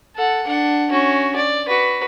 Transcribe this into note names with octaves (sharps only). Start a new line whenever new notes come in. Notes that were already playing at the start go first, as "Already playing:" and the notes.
A4 F#5
D4 F#5
C#4 F#4
D5
F#4 B4